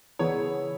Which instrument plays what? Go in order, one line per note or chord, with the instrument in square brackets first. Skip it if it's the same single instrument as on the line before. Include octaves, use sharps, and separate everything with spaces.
[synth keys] C#3 E3 B3 E4 G#4 [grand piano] C#5